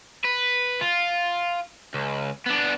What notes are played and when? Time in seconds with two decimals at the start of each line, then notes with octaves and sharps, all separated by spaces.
0.25 B4
0.81 F4
1.94 C#2
2.46 B3 D4